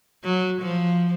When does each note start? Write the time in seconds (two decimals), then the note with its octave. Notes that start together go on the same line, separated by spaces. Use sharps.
0.24 F#3
0.62 F3